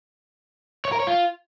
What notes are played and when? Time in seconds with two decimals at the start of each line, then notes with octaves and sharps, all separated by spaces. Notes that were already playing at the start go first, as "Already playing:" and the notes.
0.85 C#5
0.92 A#4
1.00 C#5
1.07 F4